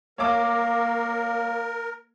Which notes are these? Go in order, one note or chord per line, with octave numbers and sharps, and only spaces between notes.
A#3 A#4 C#5 F5 D6